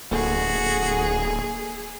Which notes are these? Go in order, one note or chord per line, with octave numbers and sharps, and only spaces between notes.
D1 A#3 F#4 G#4 A4